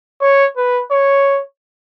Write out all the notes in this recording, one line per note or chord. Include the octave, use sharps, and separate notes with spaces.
C#5
B4
C#5